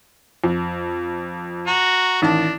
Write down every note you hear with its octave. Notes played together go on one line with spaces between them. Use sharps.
F2
F#4 A#5
A1 D#3 D4 A5